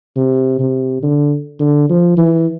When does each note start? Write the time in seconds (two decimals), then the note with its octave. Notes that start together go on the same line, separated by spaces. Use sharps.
0.16 C3
0.60 C3
1.03 D3
1.60 D3
1.89 F3
2.17 E3